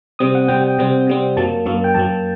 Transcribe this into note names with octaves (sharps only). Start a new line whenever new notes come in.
C3 G3 C4 D#6
F#5
C3 G3 C4 G5
G5
C3 G3 C4
C3 G3 C4
F#2 F#3 A#3 A5
F#2 F#3 A#3
G5
F#2 F#3 A#3 A5